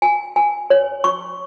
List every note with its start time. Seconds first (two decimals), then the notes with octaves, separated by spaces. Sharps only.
0.02 G#5
0.36 G#5
0.70 C#5
1.04 C#6